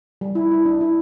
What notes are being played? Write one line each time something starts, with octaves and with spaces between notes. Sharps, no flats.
G3
E4
E4
D4
E4